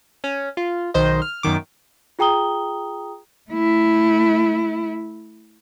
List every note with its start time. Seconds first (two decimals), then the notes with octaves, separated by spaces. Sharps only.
0.24 C#4
0.57 F4
0.94 B1 D#3 C5 D#5
1.22 F6
1.43 F#2 B2 D#3 D6
2.19 F4 G#4 G5 A#5 D#6 G7
3.51 A3 E4